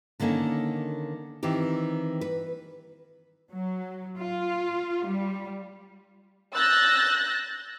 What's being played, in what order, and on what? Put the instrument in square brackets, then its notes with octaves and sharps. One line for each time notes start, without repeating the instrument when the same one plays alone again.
[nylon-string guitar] D3 D#3 A#3 C4 C#4
D#3 E3 C4 G4
B4
[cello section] F#3
F4
G3
[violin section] E6 F#6 G6 A6 A#6